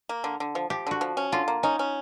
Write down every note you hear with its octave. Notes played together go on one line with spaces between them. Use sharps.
A#3
D3
D3
F3
F3 G4
D3 F#4
F3
C#4
D3 F4
A#3
C#4 D#4
C#4